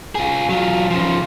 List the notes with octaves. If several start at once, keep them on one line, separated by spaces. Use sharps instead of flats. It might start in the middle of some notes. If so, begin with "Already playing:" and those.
F4 G#4
F#3 F4
C#3 F3